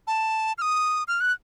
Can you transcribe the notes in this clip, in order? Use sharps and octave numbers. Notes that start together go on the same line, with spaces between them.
A5
F6
D#6
F6
F#6